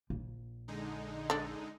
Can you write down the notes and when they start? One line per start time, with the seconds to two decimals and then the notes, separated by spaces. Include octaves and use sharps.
0.10 A#1
0.68 D3 G#3 D#4
1.30 D4 A4